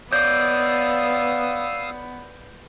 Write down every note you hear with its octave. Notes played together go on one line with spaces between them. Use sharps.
B3 C#5 D5 F5 D#6 E6 G6